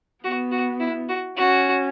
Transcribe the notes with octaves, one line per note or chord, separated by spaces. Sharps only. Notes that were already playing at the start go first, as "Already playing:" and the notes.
B3 F#4
F#4
E4
F#4
C#4 F#4